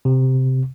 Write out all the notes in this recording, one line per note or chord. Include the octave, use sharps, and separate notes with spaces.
C3